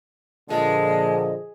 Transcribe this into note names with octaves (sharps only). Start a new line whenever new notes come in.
A#2 D3 F3 G#3 D#5 A5